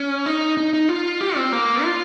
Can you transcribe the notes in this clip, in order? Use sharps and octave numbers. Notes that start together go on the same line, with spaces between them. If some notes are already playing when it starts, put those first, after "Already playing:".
Already playing: C#4
D#4
D#4
D#4
F4
G4
C4
A#3
F4